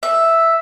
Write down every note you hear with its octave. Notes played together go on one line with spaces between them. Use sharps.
E5